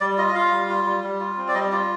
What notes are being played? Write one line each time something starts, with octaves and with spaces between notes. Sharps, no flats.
G3 D5
F4 D#5
D#5
F4 F5
G3
F4
G3
G3
F4
C4
D5
G3 D#5
F4 D5